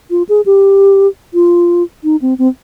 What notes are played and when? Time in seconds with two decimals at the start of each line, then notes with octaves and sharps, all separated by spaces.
0.11 F4
0.29 G#4
0.46 G4
1.34 F4
2.04 D#4
2.22 C4
2.39 C4